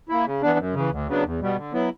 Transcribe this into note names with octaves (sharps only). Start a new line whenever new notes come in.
A#3 E4
C#3
E3 B3 D4
F#2
C#3 E3
D2
C#3 F#3 B3 D4
E2
B2 G3 B3
D3
F#3 B3 E4